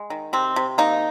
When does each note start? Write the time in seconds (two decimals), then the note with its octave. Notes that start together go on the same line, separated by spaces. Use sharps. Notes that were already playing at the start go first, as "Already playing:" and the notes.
Already playing: G#3
0.10 D#3
0.33 C3 C4
0.56 C3
0.78 A#3 D#4